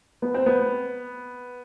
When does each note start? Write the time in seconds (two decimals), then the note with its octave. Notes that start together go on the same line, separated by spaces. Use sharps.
0.22 B3
0.34 C4
0.46 B3